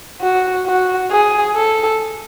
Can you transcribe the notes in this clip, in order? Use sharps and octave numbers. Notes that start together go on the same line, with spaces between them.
F#4
F#4
G#4
A4